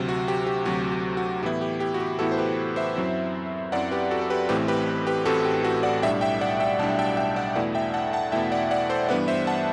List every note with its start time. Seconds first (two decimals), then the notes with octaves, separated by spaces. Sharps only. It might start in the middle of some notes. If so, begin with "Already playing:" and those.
Already playing: D2 C3 F#3
0.09 F#4
0.28 G4
0.47 G4
0.66 D2 C3 F#3 F#4
0.92 G4
1.17 F#4
1.43 A2 E3 B3 E4 G4
1.61 G4
1.80 G4
1.94 F#4
2.00 G4
2.19 A2 E3 B3 E4 F#4 A4
2.32 C5
2.38 G4 B4
2.76 C5 E5
2.96 F#2 F#3 C4 E4
3.72 F#2 F#3 C4 E4 D5 F#5
3.91 G4 B4
4.11 F#4 A4
4.21 A4
4.30 G4 B4
4.49 A1 A2 E3 A3 C4 G4 B4
4.68 G4 B4
5.07 G4 B4
5.25 A1 A2 E3 A3 C4 F#4 A4
5.45 G4
5.64 F#4 A4
5.83 D5 F#5
6.02 B1 A2 G3 D4 E5 G5
6.21 E5 G5
6.41 D5 F#5
6.60 E5 G5
6.79 B1 A2 G3 D4 F#5 A5
6.99 E5 G5
7.17 E5 G5
7.36 D5 F#5
7.55 E2 B2 A3 E4 D5 F#5
7.75 E5 G5
7.94 F#5 A5
8.13 F#5 A5
8.32 E2 B2 A3 E4 E5 G5
8.52 D5 F#5
8.71 D5 F#5
8.89 A4 C5
9.09 G2 E3 G3 B3 D4 B4 D5
9.28 C5 E5
9.47 F#5 A5